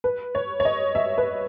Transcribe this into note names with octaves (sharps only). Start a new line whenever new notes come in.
B4
C#5
C#5
D#5
E5
B4